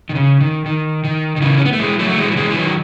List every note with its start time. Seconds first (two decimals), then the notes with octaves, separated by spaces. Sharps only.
0.09 D#3
0.15 C#3
0.41 D#3
0.66 D#3
1.04 D#3
1.36 D#3
1.42 C#3 E3
1.58 C#4
1.65 B3
1.73 A3
1.80 E3 G#3
1.99 F#3 A3
2.10 A3
2.18 E3 G#3
2.32 F#3
2.37 E3 G#3
2.50 E3
2.56 D#3 F#3